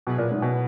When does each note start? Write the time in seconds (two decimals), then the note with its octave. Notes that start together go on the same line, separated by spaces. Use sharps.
0.07 B2 F#3 B3 E4 G#4 B4
0.18 A#2
0.31 G#2
0.42 B2